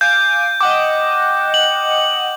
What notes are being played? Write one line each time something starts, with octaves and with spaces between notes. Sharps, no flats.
F5 G#5 D6 G6
D#5 F#5 G5 D6
F#7